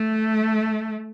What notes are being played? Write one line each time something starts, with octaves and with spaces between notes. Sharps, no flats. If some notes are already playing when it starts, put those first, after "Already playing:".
Already playing: A3